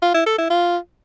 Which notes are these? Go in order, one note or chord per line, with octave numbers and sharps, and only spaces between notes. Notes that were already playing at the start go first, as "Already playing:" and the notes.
F4
E4
A4
E4
F4